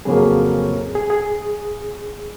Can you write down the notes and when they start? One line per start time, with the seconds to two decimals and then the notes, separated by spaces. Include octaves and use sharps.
0.05 F2 C#3 F#3 A#3 C#4 G#4
0.95 G#4
1.10 G#4